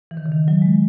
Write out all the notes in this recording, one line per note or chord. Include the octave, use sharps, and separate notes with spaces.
E3
D#3
C#3
D#3
F#3
G#3